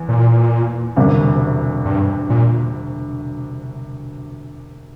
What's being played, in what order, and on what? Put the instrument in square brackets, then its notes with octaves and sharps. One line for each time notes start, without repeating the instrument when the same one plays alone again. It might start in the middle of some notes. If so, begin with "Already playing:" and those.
Already playing: [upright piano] E2
[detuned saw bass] A#2
[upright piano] E1 D2 C3 G3
[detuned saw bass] G2
A#2